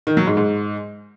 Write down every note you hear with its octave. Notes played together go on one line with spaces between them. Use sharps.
D#3
F#3
G#2
G#2